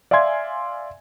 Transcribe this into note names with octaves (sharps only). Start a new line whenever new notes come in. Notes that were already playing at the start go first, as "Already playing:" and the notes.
D5 E5 F5 G#5 C6 G#6